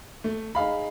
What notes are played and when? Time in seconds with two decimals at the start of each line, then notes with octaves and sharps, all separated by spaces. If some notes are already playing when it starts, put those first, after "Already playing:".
0.24 A3
0.55 D#4 G#4 F5 B5